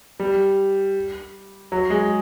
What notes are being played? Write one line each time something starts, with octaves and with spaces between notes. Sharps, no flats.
G3
F#3
G#3